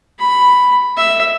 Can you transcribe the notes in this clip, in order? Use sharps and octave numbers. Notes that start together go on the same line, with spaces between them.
B5
E5